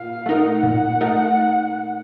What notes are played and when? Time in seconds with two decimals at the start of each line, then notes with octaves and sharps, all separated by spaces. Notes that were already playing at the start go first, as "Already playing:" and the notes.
Already playing: A#2 F5
0.26 A3 D#4 A#4 F#5
0.63 A#2
1.01 A3 D#4 A#4